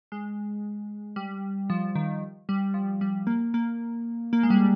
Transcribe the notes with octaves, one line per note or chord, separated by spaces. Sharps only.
G#3
G3
F3
D#3
G3
F3
G3
A#3
A#3
A#3
G#3
G3